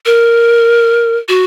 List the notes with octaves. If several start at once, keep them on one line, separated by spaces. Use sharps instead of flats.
A#4
F#4